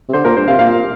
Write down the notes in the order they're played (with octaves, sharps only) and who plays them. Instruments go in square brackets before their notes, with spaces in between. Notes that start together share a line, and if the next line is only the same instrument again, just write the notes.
[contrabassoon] C3
[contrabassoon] D3 [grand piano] C5
[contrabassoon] A#2 [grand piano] A#4
[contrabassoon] G2 [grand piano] C5
[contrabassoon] C3 [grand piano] F5
[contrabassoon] A#2 [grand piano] F5